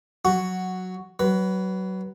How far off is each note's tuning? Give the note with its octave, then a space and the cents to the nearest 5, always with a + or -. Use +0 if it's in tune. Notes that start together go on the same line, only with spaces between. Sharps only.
F#3 +0 F#4 +5
F#3 +30 B4 +0